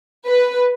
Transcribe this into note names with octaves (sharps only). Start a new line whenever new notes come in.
B4